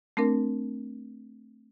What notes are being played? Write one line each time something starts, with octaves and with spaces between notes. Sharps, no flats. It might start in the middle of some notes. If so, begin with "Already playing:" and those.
A3 C4 D4 A#4